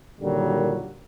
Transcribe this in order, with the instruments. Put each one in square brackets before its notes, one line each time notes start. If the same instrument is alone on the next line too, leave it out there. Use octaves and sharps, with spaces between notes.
[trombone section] A#2 D3 D#3 F#3 G3